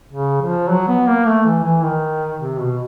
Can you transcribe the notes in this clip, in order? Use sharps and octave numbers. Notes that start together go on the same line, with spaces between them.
C#3
F3
F#3
B3
A#3
A3
E3
E3
D#3
C3
B2